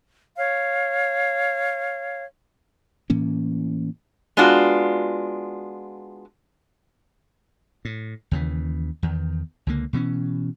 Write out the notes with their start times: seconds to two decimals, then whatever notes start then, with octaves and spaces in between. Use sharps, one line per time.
0.37 C#5 F5
3.10 A2 E3 A#3 C#4
4.37 G#3 B3 D4 F4 F#4
7.85 A2
8.31 D#2 C#3 E3
9.03 E2 D#3
9.67 C#2 D3 A#3
9.93 B2 E3 A#3 C#4